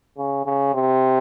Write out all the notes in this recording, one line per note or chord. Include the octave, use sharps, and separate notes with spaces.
C#3
C#3
C3